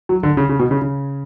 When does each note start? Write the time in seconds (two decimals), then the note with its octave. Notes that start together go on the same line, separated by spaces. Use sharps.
0.09 F#3
0.23 D3
0.37 C#3
0.49 C#3
0.59 B2
0.71 C#3
0.82 C#3